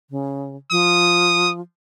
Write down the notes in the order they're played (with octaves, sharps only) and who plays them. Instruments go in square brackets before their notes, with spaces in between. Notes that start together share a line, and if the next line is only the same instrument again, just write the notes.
[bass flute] C#3
[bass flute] F3 [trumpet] D#6